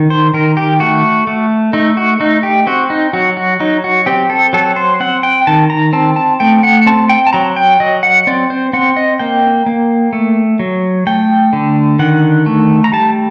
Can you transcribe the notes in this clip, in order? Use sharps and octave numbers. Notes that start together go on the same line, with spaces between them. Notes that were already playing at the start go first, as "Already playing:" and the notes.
Already playing: D#3
C5
D#3 A#4
G4
A3 F#4
A3
A3 D#4
F#4
A3 D#4
G4
C4 F#4
D#4
F#3 F#4
F#4
F#3 D#4
F#4
C4 G4
A4
F#3 A4
C5
C4 F#5
G5
D#3 A5
A#5
C4 A5
A5
A3 G5
F#5
C4 A5
G5
A5
F#3 A#5
G5
F#3 D#5
F#5
C4 D5
C5
C4 F#5
D#5
A#3 G5
A#3
A3
F#3
A3 G5
D3
D#3 F#5
A3
A#5
G3 A5